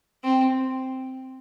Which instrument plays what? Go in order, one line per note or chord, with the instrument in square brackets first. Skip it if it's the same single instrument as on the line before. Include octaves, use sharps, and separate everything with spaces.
[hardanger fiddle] C4